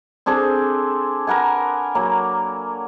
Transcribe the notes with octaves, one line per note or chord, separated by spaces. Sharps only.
C4 D4 G#4 A4
A#4 B4 F#5 G#5
F#3 A#3